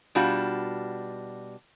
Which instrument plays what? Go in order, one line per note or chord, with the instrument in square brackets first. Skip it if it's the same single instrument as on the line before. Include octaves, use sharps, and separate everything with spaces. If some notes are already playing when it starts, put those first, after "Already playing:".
[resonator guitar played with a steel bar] B2 G3 D4 F4 F#4